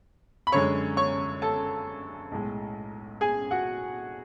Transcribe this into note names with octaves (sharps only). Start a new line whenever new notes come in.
B5
F#2 D3 G#3 C#5 C#6
C#5 C#6
A4 A5
B1 A2 G#3
G#4 G#5
F#4 F#5